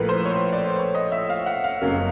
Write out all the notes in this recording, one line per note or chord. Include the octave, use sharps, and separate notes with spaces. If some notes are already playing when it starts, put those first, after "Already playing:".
Already playing: A#1 A2 F3 A#4 B4
C5
C#5
D5
C#5
D#5
E5
F5
F#5
F5
F#1 F2 C#3 F#3 A#3